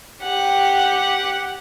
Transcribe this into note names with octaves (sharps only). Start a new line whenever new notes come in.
G4 F#5